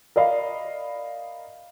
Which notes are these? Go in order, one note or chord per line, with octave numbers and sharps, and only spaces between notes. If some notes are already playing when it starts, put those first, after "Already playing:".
A#4 D5 D#5 F5 B5